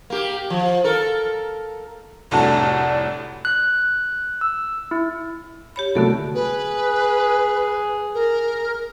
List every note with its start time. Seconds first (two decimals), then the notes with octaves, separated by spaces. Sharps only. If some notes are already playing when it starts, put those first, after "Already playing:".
0.10 A#3 G4
0.50 F3
0.84 A4 A#4
2.31 F1 C2 A2 D4 F#4 A5
3.45 F#6
4.41 E6
4.91 E4
5.76 G4 C#5 B5
5.95 C2 D3 F#3 A3 B3 A4
6.35 G#4 B4
8.14 A#4